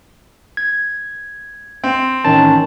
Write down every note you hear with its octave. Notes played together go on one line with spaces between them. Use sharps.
G#6
C4
A1 D#3 C#4 A5